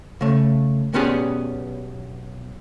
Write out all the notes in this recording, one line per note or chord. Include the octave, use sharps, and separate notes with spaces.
C#3 A3
B1 B3 C#4 G4 G#4 D5